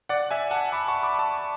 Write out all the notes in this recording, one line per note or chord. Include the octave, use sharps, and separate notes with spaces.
D5 F#5
E5 G#5
F#5 A5
B5 D6
A5 C#6
B5 D6
A5 C#6